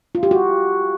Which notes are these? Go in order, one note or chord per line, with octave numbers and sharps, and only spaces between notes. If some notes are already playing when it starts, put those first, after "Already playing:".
F4
G4
F#4